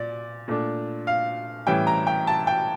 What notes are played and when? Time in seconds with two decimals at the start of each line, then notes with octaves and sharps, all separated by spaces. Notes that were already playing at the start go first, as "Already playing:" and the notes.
Already playing: A#2 D5
0.48 A#2 A3 D4
1.07 F5
1.67 A2 E3 G3 C#4 E4 G5
1.87 A#5
2.07 G5
2.27 A5
2.47 G5